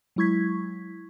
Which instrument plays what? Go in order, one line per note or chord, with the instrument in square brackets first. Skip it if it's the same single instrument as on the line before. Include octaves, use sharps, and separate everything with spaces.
[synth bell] F#3 G#3 E4 C#6 G#6 B6